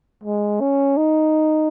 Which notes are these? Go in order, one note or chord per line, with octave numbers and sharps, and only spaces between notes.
G#3
C#4
D#4